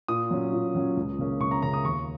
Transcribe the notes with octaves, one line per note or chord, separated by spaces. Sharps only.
A#2 D#6
F#3 C#4
A#2
F#3 C#4
C#2
C#3 A#3 C#4
C#2 C#6
A#5
C#3 A#3 C#4 A#5
D#6
D#2 C#6